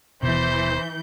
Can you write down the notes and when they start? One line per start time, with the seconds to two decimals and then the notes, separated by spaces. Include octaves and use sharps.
0.23 D#1 B2 E3 C5 G6